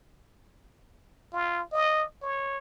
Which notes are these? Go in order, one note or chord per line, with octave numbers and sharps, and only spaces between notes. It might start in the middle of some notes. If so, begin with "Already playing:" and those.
F4
D#5
C#5